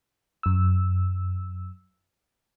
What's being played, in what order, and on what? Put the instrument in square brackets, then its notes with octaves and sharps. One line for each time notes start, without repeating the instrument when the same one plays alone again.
[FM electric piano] F#2 E6